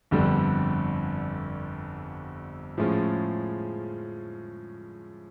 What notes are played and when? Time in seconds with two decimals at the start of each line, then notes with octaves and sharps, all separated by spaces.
0.11 G1 F2 D3 G3
2.77 A2 F3 G#3 C#4 F4